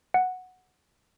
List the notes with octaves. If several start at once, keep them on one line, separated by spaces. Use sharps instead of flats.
F#5